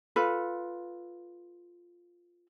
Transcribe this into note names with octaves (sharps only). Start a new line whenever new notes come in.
F4 A4 B4